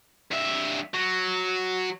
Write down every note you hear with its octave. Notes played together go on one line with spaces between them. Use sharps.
G2 E5
F#3